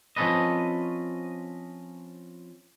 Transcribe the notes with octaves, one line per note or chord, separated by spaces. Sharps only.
F3 C4 C#4 A4 B4 D#5